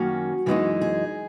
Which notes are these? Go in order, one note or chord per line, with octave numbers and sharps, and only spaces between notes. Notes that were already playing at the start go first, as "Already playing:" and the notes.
Already playing: F#2 D#3 A#3 C#4 F#4
F#2 E3 G#3 B3 D#4
G#4